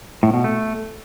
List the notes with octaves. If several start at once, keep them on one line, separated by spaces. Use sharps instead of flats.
A2
B2
A3